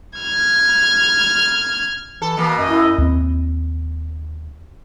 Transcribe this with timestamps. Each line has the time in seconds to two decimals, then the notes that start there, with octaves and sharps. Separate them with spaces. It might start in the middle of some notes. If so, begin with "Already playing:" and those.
0.19 F6 G#6
2.22 E3 A4
2.37 B2 E3 A#3
2.57 F#2 D#5
2.68 E4
2.98 D#2 C4